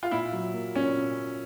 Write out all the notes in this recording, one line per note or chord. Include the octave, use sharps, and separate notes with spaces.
F4
A#2 E4
F#3
A#3
A#2 C#4